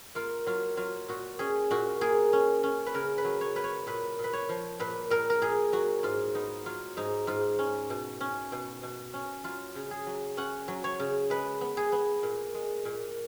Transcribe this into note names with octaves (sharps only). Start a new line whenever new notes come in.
A#3 F4
F#3 F4
F#3 F4
A#2 F#4
C#4 G#4
A#2 F#4
A#3 G#4
C#4
C#4
B4
C#3 A#4
B4
F#3
C#5
A#3 B4
C#5
A#2 B4
A#2
B4
C#5
F3
A#2 B4
A#2 A#4
A#4
A#2 G#4
F#3 F#4
G#2 F4
B3 D#4
F#3 F4
G#2 D#4
G#2 F4
C#4
B2
C#4
B2
B2
C#4
F#3 F4
C#3
G#4
F#3
C#4 F#5
F#3
C#5
C#3
G#3 B4
B3
G#4
B3
A#2
G#3
A#2